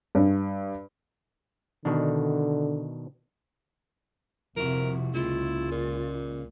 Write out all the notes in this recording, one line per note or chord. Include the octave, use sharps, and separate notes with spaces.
G2
B2 D3 D#3 D4
F2 C3 F3 E4 F#4 A#4
C#2 C#3 G#3 A#3 E4 F4
A#2